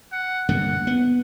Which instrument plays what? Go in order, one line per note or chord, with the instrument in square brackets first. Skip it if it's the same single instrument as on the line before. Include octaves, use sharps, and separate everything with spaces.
[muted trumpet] F#5
[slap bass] G2 D3 A#3 [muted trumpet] F#5
[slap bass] B3